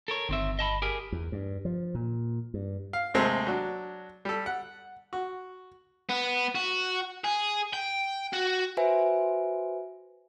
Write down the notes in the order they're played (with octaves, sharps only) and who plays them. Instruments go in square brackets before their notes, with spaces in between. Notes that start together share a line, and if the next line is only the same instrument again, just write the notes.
[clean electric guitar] A4 A#4 C#5
[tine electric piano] G1 [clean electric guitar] D#3 C4 E5
[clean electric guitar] D#5 A5 B5
G4 G#4 A#4
[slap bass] E2
G2
F3
A#2
G2
[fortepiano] F5
D#2 C3 G#3 A3 C4
F#3 D4
G3 A4
F#5
F#4
[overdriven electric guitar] B3
F#4
G#4
G5
F#4
[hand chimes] F#4 B4 C5 E5 G#5